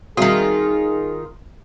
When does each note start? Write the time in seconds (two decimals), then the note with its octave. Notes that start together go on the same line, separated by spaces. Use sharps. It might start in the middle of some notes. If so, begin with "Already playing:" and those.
0.17 D#3 G3 C4 F4 F#4 G#4